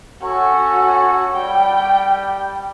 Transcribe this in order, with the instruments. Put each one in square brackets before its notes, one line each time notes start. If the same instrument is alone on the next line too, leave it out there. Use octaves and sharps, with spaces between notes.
[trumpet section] C#4 A4 C#5 [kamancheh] F#4
[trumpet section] G3 [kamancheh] G5